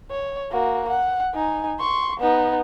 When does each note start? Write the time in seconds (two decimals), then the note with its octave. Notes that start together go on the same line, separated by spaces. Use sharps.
0.11 C#5
0.52 A#3 F#4
0.88 F#5
1.34 D#4 G#5
1.80 C6 C#6
2.20 B3 D#4